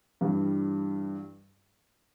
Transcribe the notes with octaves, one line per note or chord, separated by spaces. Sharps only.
G2 E3 G3